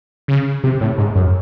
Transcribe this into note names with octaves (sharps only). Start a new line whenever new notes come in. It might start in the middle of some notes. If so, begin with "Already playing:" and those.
C#3
C3
A2
G#2
F#2